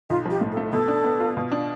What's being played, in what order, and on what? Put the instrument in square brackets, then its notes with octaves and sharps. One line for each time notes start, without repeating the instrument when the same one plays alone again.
[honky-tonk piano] B1 [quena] F4
[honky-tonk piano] F3 [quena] G4
[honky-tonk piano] A2
[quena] A4
[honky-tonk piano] A3
[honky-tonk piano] B2 [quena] A4
[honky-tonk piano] D4
B3
F4
B2
D4